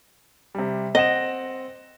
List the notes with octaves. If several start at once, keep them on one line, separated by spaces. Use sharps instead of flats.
C3 G3
C4 D#5 F#5 E7